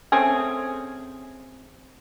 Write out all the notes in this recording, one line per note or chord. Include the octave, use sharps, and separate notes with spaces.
A3 C4 C#4 G#4